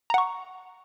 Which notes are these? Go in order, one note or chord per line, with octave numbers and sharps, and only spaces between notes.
F#5 A#5 C#6